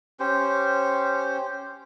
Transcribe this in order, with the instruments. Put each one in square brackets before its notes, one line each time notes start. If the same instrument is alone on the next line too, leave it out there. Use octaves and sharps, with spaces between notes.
[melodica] C#4 G4 C5